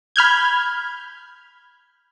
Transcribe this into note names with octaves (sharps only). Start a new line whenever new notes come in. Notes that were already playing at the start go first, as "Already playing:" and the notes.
B5 F6 G6 G#6